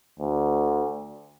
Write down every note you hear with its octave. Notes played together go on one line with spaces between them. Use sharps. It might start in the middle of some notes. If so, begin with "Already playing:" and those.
D2